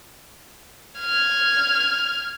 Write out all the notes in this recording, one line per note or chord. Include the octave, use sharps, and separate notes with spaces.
F6 G#6